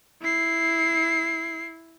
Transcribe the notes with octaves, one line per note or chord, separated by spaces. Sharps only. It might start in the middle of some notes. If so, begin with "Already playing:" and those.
E4 C7